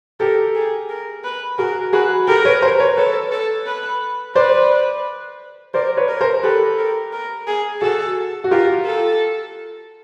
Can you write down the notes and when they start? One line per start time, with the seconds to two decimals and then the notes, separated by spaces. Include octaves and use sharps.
0.20 G4 A4 A#4
0.55 G#4
0.90 A#4
1.24 B4
1.58 F#4 G#4 A#4
1.93 F#4 G#4 B4
2.28 G4 A4 A#4
2.45 B4 C#5
2.62 A#4 C5
2.80 B4 C#5
2.97 A4 B4 C#5
3.32 A4
3.67 B4
4.36 B4 C5 D5
5.74 A#4 C5 D5
5.97 B4 C#5
6.09 A#4
6.21 A#4 C5
6.43 G4 A4 B4
6.78 A#4
7.13 A#4
7.47 G#4
7.82 F#4 G#4 A4
8.44 F#4
8.51 F4 G4 A#4
8.86 A4